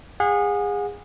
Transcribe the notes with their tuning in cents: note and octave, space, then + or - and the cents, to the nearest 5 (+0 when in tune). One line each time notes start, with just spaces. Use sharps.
G#4 -25 F#5 -40